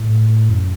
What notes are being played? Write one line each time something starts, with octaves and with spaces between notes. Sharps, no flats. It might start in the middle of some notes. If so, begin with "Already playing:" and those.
Already playing: A2
F#2